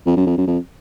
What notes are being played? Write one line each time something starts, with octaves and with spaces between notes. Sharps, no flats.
F2
F#2
F2
F#2
F2